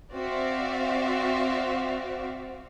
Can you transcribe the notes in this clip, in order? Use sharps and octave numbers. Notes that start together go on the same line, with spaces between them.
C4 F#4 D5 E5 F5